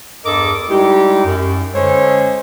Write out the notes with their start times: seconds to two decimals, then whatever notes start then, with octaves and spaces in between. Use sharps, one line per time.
0.25 E2 G2 A4 A#4 D#5 D6
0.69 G3 G#3 D#4 E4 G4
1.25 F#2
1.74 D3 G#3 C#4 A4 C5 C#5